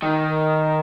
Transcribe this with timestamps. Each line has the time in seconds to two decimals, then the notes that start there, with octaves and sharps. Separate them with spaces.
0.02 D#3